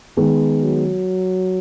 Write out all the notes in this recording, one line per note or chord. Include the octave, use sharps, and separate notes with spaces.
D#3 G#3 B3
F#3